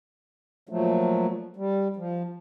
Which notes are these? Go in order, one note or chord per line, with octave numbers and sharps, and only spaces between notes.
A#2 F3 F#3 A3
G3
F3